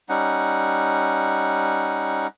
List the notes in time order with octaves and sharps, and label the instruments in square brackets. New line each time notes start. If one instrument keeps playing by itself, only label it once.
[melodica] G3 C#4 D#4 F#5